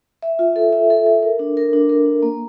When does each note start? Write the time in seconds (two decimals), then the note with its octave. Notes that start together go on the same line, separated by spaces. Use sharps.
0.22 E5
0.39 F4
0.56 A4
0.73 E5
0.90 A4
1.06 A4
1.23 A#4
1.39 D4
1.57 A#4
1.73 D4
1.89 A#4
2.06 D4
2.22 A#3